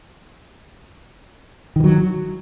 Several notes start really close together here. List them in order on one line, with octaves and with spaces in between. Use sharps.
D#3 E3 F#3